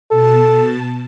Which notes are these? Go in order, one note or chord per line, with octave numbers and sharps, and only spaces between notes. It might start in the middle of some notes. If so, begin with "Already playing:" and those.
B2 A4 A5